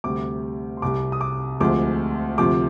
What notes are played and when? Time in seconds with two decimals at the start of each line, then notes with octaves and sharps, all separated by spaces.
0.04 D2 C3 G3 D6
0.77 C6
0.82 C2 C3 G3 D6
1.12 D#6
1.21 D6
1.60 D2 C3 F3 G#3 D6
2.38 D2 C3 F3 D6